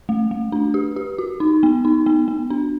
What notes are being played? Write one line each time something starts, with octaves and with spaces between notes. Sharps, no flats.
A3
A3
D4
G4
G4
F#4
D#4
B3
D#4
B3
B3
D4